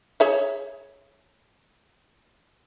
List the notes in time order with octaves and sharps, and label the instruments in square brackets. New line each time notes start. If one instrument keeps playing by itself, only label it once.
[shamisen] G#4 C#5 E5